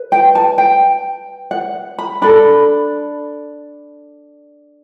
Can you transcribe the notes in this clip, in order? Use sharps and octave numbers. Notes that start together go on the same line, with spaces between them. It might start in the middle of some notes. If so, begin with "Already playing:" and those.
Already playing: B4
G5
A5
G5
F#5
B5
D4 A4 B5